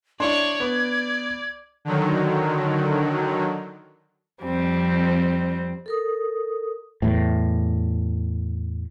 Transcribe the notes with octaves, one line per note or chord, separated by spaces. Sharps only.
D4 E4 C#5 D5 C6 G#6
B3 D5
D3 D#3 F#3
F2 G3 C4
A4 A#4 D#6
E2 A2